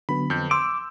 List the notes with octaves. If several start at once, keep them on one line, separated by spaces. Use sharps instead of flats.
D3 F#3 B3 B5
F2 G6
C6 D6 E6